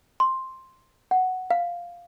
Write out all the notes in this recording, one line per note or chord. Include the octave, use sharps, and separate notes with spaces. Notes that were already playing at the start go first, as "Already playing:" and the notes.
C6
F#5
F5